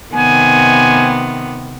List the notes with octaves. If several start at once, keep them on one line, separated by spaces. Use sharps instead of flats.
C3 D#3 B3 G#5